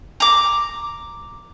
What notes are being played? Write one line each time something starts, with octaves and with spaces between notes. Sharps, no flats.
A#5 D6